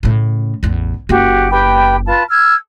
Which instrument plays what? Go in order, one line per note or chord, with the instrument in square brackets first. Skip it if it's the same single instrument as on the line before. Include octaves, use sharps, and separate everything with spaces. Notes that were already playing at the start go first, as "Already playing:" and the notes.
[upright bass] A2 C#3
A1 E2
[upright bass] F#1 A#3 [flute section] F#4 G4
[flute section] G4 B4 G5
F4 B4 A5
E6 F6 G#6